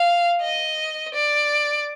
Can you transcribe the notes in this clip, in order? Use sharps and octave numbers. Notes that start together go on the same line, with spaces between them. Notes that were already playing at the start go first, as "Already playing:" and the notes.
Already playing: F5
D#5
D5